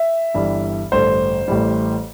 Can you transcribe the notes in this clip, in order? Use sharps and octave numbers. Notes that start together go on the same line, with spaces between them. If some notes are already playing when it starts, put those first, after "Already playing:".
Already playing: E5
G1 G2 E3 G3
A1 G2 D3 C5
A1 A2 E3 G3